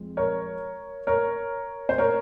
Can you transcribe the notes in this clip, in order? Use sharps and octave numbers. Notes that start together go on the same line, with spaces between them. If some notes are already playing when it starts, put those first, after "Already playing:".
Already playing: F2 G#3
A#4 C#5
A#4 C#5
C5
A#4 C#5